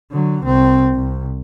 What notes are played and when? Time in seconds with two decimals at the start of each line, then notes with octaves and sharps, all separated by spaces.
0.11 D3 F#3
0.44 C2 C4
0.94 C2